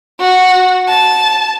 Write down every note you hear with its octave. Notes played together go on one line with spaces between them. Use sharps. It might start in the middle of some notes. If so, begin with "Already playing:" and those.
F#4
A5